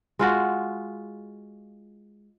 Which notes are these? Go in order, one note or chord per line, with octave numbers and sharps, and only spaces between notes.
G#3 F4 F#4